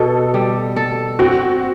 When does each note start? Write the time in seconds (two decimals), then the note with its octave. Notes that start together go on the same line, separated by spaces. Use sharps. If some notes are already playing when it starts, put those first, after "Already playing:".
Already playing: B2 A4
0.34 G3
0.76 A4
1.19 C4 F#4